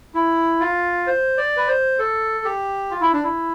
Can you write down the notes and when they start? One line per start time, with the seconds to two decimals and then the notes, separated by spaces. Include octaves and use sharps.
0.14 E4
0.60 F4
1.07 C5
1.38 D5
1.56 B4
1.68 C5
1.98 A4
2.45 G4
2.91 F4
3.01 E4
3.13 D4
3.23 E4